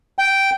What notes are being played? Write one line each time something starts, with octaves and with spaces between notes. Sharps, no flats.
G5